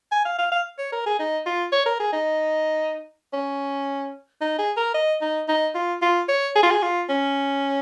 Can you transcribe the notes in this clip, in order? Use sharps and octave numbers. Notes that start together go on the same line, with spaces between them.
G#5
F5
F5
F5
C#5
A#4
G#4
D#4
F4
C#5
A#4
G#4
D#4
C#4
D#4
G#4
A#4
D#5
D#4
D#4
F4
F4
C#5
G#4
F4
G#4
F4
C#4